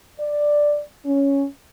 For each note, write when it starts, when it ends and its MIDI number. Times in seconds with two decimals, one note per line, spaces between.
0.20 0.81 74
1.05 1.45 61